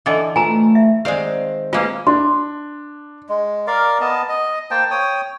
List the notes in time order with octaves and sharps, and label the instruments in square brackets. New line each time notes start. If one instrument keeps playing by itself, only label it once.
[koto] D3 E3 [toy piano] A4 D#5 G#5
[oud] A3 F4 B4 [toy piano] G#5 A#5
[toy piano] E5
[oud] D#3 C4 D5 [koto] G#3 F5
[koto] G#3 A#3 [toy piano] F4 B4
[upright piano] D4 [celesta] C6
[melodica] G#3
A#4 D5 F5
B3 D#5 A5
D#5
A#3 C5 G5 A5
C#5 G5 D#6